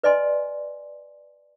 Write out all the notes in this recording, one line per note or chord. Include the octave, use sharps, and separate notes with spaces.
B4 D5 D#5 G#5 C6